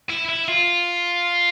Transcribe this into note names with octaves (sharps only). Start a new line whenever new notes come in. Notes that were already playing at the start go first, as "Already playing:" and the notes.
E4
E4
F4